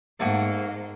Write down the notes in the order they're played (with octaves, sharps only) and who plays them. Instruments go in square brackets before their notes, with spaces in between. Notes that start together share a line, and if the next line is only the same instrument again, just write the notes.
[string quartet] G#2 [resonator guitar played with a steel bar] A3 A#3 F#5